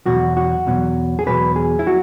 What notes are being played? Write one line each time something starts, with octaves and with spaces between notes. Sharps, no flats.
E2 B2 F#3 F#4
F#4
E2 B2 F#3
G#4
E2 B2 F#3 B4
G#4
E4
F#3 F#4